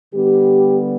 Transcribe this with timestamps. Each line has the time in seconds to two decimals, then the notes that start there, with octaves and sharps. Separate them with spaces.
0.14 D3 G3 B3 G4